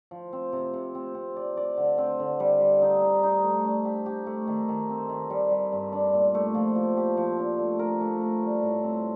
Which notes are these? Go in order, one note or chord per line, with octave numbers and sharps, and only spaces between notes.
F3
C4
C3
C3
C4
C4
D5
D5
D3
C4
D3
G3
G3
D#4
D#4
D#4
A3
D4
G4
G4
A3
D#3
D#3
C4
D#3
G3
G3
G2
D4
A#2
A3
F3
F3
G4
F3
D4
A3
A#4
A3
A#4
G3
A2
C4